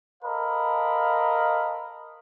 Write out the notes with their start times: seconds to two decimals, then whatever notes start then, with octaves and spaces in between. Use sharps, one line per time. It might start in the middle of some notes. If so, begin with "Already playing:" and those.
0.24 A4 A#4 C5 D#5 F5 B5